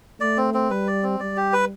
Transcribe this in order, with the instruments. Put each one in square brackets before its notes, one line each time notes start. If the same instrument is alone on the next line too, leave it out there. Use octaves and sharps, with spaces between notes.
[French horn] A3 [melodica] D5
[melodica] C4
C4
[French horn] G3 [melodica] B4
[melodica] D5
C4
[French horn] G3 [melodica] D5
[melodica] G4
B4